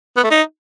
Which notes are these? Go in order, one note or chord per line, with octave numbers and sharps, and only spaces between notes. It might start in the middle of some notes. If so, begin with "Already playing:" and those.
B3
A3
D#4